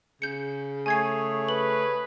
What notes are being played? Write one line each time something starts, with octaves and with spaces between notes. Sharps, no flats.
C#3 G6 C#7
A3 G#4 C#5 G#5 G#6 C7
B4 F#7